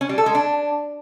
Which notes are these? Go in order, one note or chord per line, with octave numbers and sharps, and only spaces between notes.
C#4
G3
A4
G#3
D4